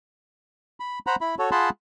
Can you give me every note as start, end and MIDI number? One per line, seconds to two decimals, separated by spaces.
0.80 0.99 83
1.07 1.16 72
1.07 1.16 78
1.07 1.16 82
1.07 1.16 83
1.21 1.35 64
1.21 1.35 83
1.39 1.50 66
1.39 1.50 69
1.39 1.50 73
1.51 1.70 65
1.51 1.70 68
1.51 1.70 78
1.51 1.70 81
1.51 1.70 83
1.51 1.70 84